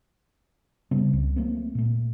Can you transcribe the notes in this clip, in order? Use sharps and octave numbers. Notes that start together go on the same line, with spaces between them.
C#3 G3 B3 C4
C#2
F#3 A3 A#3 C4
A#2 A3